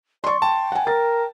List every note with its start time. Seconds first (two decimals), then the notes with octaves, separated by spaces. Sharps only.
0.24 D5 C6 C#6
0.42 G5 A5
0.72 F#5 G#5
0.87 A#4 A6